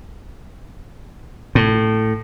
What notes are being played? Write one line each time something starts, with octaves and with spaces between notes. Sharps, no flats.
A2